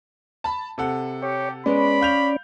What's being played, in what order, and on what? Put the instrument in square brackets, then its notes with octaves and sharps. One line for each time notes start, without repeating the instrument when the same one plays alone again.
[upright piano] A5 B5
C3 A4 F#5
[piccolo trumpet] G4 [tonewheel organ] C#5
[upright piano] G#3 B3 [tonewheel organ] C#4 D5 [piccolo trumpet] B5
[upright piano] F5 G6 F7